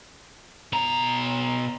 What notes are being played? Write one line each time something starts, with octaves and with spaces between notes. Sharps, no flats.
B2 A#5